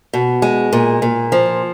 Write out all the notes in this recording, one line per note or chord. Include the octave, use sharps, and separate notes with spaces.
B2
G#3
A#2
A#2
F3